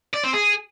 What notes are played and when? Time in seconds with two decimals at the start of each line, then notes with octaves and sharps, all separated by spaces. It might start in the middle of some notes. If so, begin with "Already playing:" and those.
0.14 D5
0.24 C4
0.33 G#4